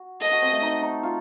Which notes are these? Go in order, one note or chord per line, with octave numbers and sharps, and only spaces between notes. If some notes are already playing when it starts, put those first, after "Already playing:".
Already playing: F#4
A4 D#5
F#4
C4
A3
D#4
D#4
F4